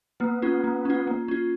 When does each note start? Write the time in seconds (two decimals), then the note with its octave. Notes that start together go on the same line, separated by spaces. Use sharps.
0.20 A#3 B3
0.42 C#4 F4
0.64 A#3
0.85 C#4 F4
1.07 A#3
1.28 C#4 F4